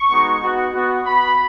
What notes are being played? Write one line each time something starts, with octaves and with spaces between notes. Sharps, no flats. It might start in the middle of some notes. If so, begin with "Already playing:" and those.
Already playing: C#6
G#3 B3 D#4 F#4
B3 D#4 F#4
B3 F#4
B3 F#4 B5